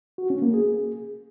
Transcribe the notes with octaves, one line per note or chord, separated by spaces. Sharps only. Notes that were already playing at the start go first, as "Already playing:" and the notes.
F#4
C#4
A#3
G#4